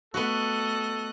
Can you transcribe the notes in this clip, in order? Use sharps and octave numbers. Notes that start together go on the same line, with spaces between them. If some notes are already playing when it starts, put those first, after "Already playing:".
A3 B3 F#4 A4 D#5 F#6